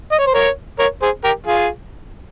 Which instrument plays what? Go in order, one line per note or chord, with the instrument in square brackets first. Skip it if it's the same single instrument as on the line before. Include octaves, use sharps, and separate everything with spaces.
[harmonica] D#5
C#5
C5
A#4 C#5
A#4 C#5
G#4 C5
G4 A#4
F4 G#4